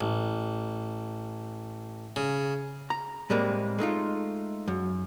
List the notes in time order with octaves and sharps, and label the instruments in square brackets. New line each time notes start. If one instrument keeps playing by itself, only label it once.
[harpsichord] A1
C#3
[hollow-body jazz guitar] A#5
A2 G3 G#3 A#3 C4
G#3 A3 D#4 F4
F#2